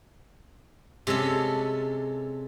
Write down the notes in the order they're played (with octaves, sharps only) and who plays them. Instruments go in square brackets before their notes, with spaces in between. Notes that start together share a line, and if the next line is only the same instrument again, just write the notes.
[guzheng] C3 G#3 C#4 A4